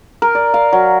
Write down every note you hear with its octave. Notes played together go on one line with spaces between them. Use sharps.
A#4
D5
F5
F#3